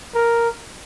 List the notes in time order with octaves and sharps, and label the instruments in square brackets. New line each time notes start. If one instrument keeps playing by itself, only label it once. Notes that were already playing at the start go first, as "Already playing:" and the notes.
[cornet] A#4